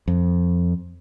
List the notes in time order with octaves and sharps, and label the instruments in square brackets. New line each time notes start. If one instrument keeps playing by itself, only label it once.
[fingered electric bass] F2